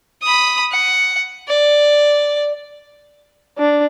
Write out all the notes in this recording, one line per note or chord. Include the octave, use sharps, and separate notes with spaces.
B5 D#6
F#5
D5
D4